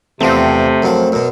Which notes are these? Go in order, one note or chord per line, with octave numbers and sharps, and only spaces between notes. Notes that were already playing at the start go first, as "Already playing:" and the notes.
E2 C3 F3 A3 C4
F#2 F3
F#2 B2